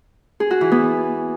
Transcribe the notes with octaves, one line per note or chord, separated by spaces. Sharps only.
G#4
F#4
E3
B3